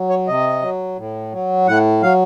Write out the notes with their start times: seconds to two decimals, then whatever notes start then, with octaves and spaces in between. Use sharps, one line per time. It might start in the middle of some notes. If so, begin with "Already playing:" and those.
Already playing: F#3
0.09 C#5
0.28 C3 D#5
0.62 F#3
0.98 A2
1.32 F#3
1.67 A2 F#5
2.02 F#3 F5